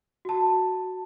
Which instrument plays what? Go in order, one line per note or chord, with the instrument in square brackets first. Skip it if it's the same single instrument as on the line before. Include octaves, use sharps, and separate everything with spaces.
[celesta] F#4 A5